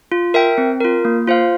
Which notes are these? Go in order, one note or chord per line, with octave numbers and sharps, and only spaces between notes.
F4
A#4 E5 G5
C4
F4 A#4
A#3
F4 C5 F5